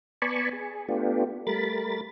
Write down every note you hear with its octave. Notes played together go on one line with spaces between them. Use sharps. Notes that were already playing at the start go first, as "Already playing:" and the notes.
B3 D5 G#5 A5 B5 C#6
G#4
A3 B3 D4 F4 G4
G3 A3 A#4 B5 A6